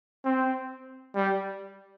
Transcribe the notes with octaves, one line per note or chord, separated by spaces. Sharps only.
C4
G3